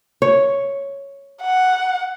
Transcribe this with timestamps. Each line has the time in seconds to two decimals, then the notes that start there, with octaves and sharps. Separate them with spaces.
0.22 C#5
1.42 F#5